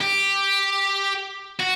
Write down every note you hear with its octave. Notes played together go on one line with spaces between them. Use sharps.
G4
F#4